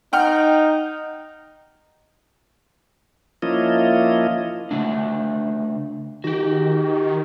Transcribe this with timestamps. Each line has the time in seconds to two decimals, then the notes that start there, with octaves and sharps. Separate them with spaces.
0.13 D#4 F#5 G5 F6
3.42 F3 A#3 C#4 E4 F4 D#5
4.71 C#3 A3 D4
6.24 D#3 F#4 G4